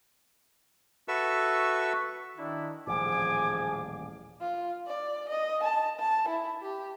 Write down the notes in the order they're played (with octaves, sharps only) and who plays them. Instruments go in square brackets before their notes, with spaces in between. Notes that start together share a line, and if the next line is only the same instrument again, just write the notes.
[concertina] F#4 A4 B4 E5 C#6 E6
[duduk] D#3 [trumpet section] D4 E4
[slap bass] D#1 A1 A#2 [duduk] F3 [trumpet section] G#4 G#5 [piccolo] D6
[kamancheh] F4
D5
D#5
A5
A5
E4
G4